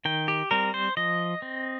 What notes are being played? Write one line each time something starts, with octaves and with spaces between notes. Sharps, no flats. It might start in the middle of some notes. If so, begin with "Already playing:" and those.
D#3 G5
G4
G3 C4 A#4
C5
F3 D#5
C4